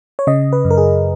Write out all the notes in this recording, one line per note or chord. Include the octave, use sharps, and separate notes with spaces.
C#5
C#3 D#5
B4
F#2
A#4
G#4